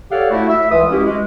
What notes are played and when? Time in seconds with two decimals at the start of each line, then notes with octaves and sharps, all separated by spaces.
0.11 G4 A4 C#5 D5 F5 F#5
0.31 A3 E4 F#4
0.49 E5
0.71 C2 E3 G#3 F4 B4 D#6
0.90 G#3 C#4 E4 F#4 G4
1.04 G#3